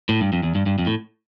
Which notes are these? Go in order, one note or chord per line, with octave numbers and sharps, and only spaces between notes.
A2
G2
F2
E2
G2
G2
F2
A2